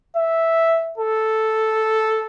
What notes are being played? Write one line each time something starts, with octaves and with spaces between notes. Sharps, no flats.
E5
A4